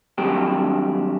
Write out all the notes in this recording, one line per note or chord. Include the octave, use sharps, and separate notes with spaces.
G2 D#3 F#3 C4 G4